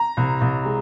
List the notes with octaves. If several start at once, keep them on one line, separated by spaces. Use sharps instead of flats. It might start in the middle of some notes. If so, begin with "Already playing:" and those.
Already playing: A#5
C2
C2
G#3